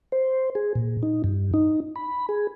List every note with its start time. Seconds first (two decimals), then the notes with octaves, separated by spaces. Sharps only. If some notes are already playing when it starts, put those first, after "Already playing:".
0.12 C5
0.55 G#4
0.75 A#2
1.03 D#4
1.24 G2
1.54 D#4
1.96 B5
2.29 G#4